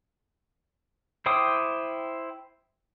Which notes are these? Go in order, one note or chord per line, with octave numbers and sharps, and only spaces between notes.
E4 C5 G5 D6 D#6